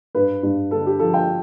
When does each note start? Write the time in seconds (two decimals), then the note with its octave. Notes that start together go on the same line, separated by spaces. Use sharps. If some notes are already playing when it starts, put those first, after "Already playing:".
0.15 G2 B4
0.43 G2
0.71 D3 A4
0.86 G4
0.99 F3 A4
1.14 G5